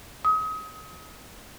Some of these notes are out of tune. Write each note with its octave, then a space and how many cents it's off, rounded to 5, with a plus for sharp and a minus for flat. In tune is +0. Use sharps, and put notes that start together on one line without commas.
D#6 +30